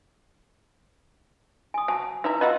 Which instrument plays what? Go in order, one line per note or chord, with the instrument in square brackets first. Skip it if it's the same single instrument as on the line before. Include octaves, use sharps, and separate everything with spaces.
[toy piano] G#5 D#6
[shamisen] F#3 [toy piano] G#5 A5
[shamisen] D#4 E4 A#5 [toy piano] B4
[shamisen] F4 F#4 B4 [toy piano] D#5 E6